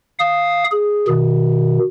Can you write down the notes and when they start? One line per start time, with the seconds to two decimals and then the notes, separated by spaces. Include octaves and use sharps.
0.19 F5 D#6
0.72 G#4
1.08 B2 D#3